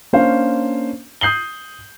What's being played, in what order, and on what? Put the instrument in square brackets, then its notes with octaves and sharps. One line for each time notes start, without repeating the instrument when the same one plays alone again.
[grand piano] A#3 C#4 D4 C5 F5
D#6 G6 C7 F#7 G7